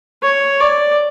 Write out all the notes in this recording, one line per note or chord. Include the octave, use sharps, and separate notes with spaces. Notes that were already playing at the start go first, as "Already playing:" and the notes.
C#5
D5